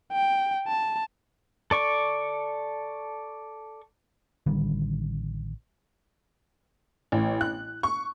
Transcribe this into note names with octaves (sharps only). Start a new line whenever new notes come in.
G5
A5
A4 D5 C#6
A1 D3 D#3 G3
A1
F#6
C#6